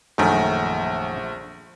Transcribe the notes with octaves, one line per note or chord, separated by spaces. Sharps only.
A#1 F#2 D#3 A3